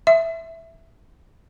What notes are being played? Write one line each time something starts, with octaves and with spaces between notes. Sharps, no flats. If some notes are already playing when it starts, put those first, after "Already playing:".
E5